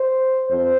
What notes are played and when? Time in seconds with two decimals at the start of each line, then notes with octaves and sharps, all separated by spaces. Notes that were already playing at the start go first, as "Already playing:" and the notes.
Already playing: C5
0.48 F2 C5